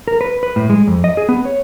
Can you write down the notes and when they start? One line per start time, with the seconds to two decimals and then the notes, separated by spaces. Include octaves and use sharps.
0.08 A#4
0.21 B4
0.43 B4
0.56 A2
0.70 G#3
0.87 F2
1.04 D#5
1.17 G#4
1.29 B3
1.45 C#5